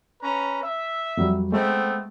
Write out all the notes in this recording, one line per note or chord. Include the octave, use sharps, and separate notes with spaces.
C#4 B4 A#5
E5
F2 F#3 G3
G#3 A3 B3 C4